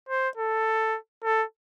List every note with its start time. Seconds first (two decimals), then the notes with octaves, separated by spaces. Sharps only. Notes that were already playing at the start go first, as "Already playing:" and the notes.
0.09 C5
0.37 A4
1.24 A4